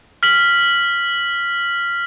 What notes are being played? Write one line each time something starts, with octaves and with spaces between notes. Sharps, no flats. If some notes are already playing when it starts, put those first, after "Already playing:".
F6 B6 F#7